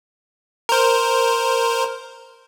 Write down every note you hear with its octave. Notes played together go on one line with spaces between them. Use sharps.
A#4 C5